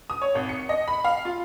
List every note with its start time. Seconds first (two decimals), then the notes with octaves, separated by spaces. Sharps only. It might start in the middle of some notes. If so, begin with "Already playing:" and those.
0.10 D#6
0.22 C#5
0.35 G#1
0.49 C#7
0.69 D#5
0.88 B5
1.04 F5
1.25 F4